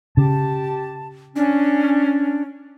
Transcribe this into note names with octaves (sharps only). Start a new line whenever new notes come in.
C#3 G4 A5
C#4 D4